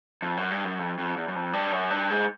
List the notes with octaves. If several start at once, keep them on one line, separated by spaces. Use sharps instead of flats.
F2
F#2
G2
F#2
F2
F2
E2
F#2
F2
G2
F#2
G2
G#2